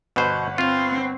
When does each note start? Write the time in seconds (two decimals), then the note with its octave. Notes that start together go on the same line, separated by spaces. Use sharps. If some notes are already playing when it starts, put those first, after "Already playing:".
0.16 G1 B2 B4 C5 F#5
0.58 C4 F4 F5